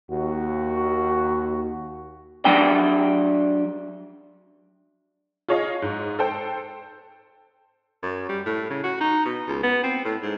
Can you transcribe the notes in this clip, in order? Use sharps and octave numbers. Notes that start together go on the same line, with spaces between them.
D#2 F#4
F#3 D4 G5
F4 G#4 C#5 D#5 F5
G#2
A4 C5 G5
F#2
G3
A2
C#3
F#4
D#4
B2
C#2
B3
C4
A2
G#2